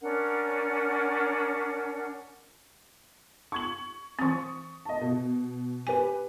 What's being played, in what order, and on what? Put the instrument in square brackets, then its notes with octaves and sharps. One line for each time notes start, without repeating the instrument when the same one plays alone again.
[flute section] C#4 D4 A#4 F#5
[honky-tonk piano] C#6 G#6 F#7
[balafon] E3 C4 [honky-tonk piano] C#6 D#6
[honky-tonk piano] D#5 A5
B2
[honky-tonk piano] G4 B4 [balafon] G#5